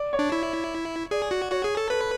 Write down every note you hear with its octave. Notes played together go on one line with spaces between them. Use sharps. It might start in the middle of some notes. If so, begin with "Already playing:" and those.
Already playing: D5
C#5
D4
E4
G#4 D5
F#4
F#4 C#5
G#4
A4
A4 B4